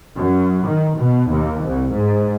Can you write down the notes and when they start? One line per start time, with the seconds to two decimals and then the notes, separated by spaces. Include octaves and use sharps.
0.17 F#2
0.66 D#3
0.96 B2
1.30 D#2
1.62 C2
1.93 G#2